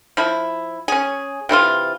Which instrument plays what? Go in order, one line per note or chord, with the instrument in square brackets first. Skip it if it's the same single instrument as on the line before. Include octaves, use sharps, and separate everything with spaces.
[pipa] F3 E4
C#4 G#4
C3 E3 E4 F4